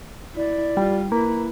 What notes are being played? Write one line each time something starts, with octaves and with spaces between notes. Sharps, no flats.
E4 D5
G3 F4
A#3 E4 B4